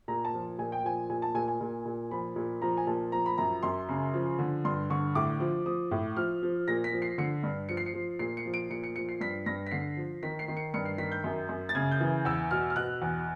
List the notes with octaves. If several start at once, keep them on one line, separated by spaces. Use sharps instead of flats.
A#2 A#5
A5
F3
A#2 G#5
G5
F3 G#5
A#2 G#5
A5
A#2 G#5
G#5
A#2
A#2
F3 B5
A#2
F3 A#5
G#5
A#2 A5
F3 A#5
B5
F#2 A#5
F#2 C6
C#3
F3
D3
G2 C6
D3 C#6
A2 D6
F3
F3 D#6
A2
F3 F6
F3
A#2 A#6
B6
F3
C7
D3 C#7
G2
F3 C#7
C7
C#7
F3
A#2 C7
C#7
F3
D7
A#2 C#7
C#7
F3 C#7
C7
G2 B6
G2 A#6
B6
D3 C7
F3
D#3 B6
C7
D#3
C#7
G2 C#7
C7
D#3 B6
G6
F#2
F#2
A6
C#3 G#6
G6
E3
E2 E6
B2 F6
F6
B2 F#6
E2